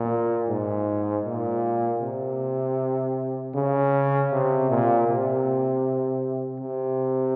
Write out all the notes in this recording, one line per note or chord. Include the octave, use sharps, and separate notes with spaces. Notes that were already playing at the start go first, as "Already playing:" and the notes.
Already playing: A#2
G#2
A#2
C3
C#3
C3
A#2
C3
C3